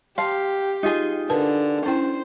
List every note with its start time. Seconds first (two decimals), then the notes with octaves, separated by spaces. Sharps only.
0.18 G4 F5 A5 C6
0.83 D#4 F4 G#4
1.30 D3 A#4 B4 A5
1.86 C#4 E4 C5 G5